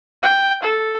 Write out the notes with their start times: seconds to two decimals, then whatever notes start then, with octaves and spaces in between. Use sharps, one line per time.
0.23 G5
0.63 A4